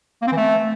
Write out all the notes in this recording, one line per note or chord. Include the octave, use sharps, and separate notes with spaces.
A#3
C4
E3
A3